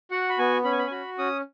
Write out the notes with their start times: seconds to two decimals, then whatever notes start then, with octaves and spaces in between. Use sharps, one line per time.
0.11 F#4 F#5
0.29 B5
0.39 B3 G#5
0.64 C#4 B5
0.71 G#5
0.79 B5
0.87 G#5
0.91 F#4 B5
1.19 C#4 D#6